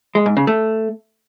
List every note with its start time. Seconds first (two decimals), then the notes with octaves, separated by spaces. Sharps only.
0.15 G#3
0.26 G#2
0.37 C#3
0.47 A3